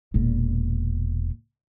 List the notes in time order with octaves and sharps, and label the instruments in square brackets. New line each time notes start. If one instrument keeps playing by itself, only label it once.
[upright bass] E1 A#2